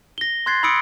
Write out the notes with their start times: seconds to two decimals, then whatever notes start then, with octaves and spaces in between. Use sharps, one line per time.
0.18 A#6 G7
0.46 C6 F#6 G#6 A6 C7
0.63 B5 C6 D#6 E6 C#7 D7